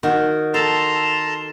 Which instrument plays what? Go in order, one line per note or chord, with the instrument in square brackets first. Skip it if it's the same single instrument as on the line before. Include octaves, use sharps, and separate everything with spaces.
[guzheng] D#3 F#4
[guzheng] A4 [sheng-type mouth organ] A5 A#5 C6